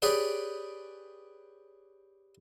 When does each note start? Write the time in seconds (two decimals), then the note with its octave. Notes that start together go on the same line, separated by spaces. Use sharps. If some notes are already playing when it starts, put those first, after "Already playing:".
0.02 G4 G#4 B4 C#5 D5 G5